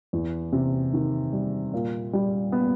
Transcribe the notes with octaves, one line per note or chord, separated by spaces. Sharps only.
E2
C3
D#3
G3
A#2
G3
B3